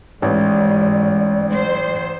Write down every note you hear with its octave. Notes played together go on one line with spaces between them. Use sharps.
A1 G#2 D5
C5